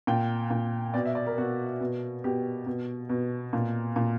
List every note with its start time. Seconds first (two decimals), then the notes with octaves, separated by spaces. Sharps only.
0.07 A#2 G5
0.50 A#2
0.94 B2 D5
1.06 E5
1.15 D5
1.27 A#4
1.37 B2 F#4
1.81 B2
2.24 B2 G4
2.66 B2
3.09 B2
3.53 A#2
3.96 A#2